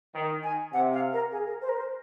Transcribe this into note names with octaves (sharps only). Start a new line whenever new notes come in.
D#3
G#5
C3 F#5
F5
A#4
G#4
A#4
C5
A#4
C5